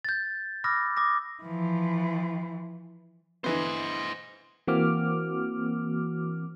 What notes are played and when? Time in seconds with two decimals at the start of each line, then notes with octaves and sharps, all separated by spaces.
0.05 G6 A6
0.64 B5 D6 E6 F6 A#6
0.97 D6 D#6 A#6
1.43 E3 F3
3.44 D3 E3 B3 C5 D#5
4.67 E3 A#3 C4 F#4 D6 F6